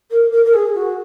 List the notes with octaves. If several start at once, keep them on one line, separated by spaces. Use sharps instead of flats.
A#4
A#4
A#4
G#4
F#4